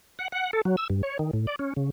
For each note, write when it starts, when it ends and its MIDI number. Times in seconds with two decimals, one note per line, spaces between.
0.19 0.28 78
0.32 0.51 78
0.53 0.61 69
0.65 0.76 54
0.77 0.88 88
0.90 1.02 43
1.03 1.18 73
1.19 1.31 51
1.33 1.46 45
1.47 1.56 74
1.59 1.73 61
1.76 1.90 49